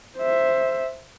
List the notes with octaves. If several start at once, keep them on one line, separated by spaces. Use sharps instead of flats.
C5 E5